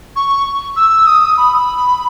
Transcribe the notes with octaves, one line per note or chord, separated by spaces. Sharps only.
C#6
E6
D#6
B5